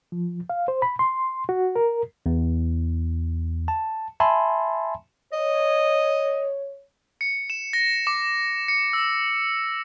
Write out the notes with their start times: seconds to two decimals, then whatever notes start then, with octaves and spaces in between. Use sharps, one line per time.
0.12 F3
0.50 F5
0.68 C5
0.82 B5
0.99 C6
1.49 F#4
1.76 A#4
2.26 E2
3.68 A5
4.20 E5 G#5 A5 B5 C6
5.33 C#5 D#5
7.21 C#7
7.50 E7
7.73 A#6
8.07 D6
8.68 C#7
8.93 E6